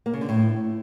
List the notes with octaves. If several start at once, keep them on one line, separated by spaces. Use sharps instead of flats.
A#3
C#3
D3
A2